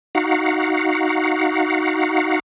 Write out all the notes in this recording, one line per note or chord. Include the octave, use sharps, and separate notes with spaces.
D#4 F#4 F5 F#5